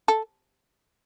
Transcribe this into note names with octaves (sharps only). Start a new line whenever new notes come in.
A4